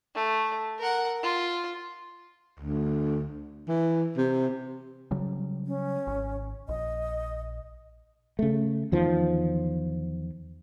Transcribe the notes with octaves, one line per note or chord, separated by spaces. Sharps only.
A3
A#4 F#5
F4
D2
E3
C3
C#3 F#3 G3
C#4
G#1
A#1 D#5
C#3 A3
E2 D#3 F3